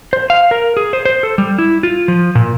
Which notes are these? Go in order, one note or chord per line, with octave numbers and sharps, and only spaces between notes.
C5
F5
A#4
G#4
C5
C5
A4
G3
E4
F4
F3
A#2